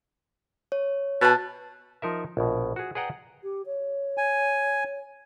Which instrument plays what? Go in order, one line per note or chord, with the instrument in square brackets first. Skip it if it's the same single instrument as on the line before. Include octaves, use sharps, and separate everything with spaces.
[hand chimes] C#5
[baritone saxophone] B2 [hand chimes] A5 A6
[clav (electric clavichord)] F3 D#4 A#4 E5
A#1 B2
F#4 G#4
G#4 B4 D5 F#5 G5 A#5
[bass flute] G4
C#5
[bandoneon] G#5